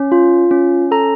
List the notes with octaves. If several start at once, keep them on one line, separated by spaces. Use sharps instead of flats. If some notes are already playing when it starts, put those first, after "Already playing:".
Already playing: C#4
F4
C#4
A4 A#5